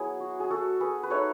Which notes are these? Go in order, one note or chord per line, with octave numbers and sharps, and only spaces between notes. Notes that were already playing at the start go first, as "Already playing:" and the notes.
Already playing: F#3 B3 E4 G#4
F#4
G#4
F#4 A4
G#4 B4
B4
A3 D#4 A4 C#5